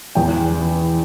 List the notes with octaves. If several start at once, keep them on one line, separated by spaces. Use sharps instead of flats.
E2 G5
E3